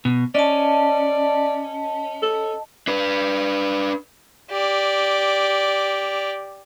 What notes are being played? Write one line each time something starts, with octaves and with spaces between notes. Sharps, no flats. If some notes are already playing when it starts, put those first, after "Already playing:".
B2
C#4 D5 D#5 A5
A4
D4 B4
G4 D5